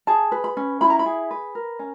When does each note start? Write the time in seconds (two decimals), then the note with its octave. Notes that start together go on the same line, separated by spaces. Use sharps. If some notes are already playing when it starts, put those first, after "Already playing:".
0.07 G#4 A5
0.32 B4
0.44 B5
0.57 C#4
0.81 E4 B5
0.90 A#5
0.99 B5
1.06 G#4
1.31 B4
1.55 A#4
1.79 C#4